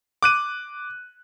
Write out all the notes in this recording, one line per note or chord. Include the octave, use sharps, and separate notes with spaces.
D6 F#6 D#7